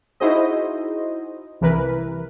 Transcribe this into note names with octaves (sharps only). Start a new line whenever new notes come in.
D#4 E4 F#4 G#4 C5 D#5
C2 E3 A#4 B4